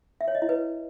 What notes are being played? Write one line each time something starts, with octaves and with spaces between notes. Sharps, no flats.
E5
C#5
D#5
E4
B4